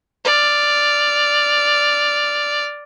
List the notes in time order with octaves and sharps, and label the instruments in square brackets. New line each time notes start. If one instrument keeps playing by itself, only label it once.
[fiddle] D5 F6